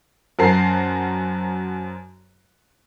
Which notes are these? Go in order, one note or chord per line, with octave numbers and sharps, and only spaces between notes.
F#2 F#4 A#4 C5 A5 C7